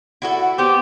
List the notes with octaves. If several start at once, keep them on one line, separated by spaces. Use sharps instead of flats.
E4 F#4 A4
B3 G4 C5